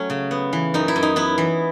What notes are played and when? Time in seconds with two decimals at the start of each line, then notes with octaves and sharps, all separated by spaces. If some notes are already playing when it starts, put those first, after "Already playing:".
Already playing: F#3 A3 C#4
0.10 C#3
0.31 B3
0.53 E3
0.74 F#2 D#4
0.88 E4
0.96 F#2
1.03 D#4
1.16 B3 E4
1.38 E3